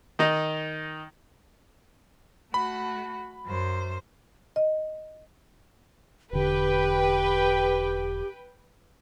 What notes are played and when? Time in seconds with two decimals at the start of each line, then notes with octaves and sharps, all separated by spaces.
0.19 D#3 D#4
2.54 A3 F#4 B5
3.47 F#2 C5
4.56 D#5
6.33 E1 D3 G4 B4 G5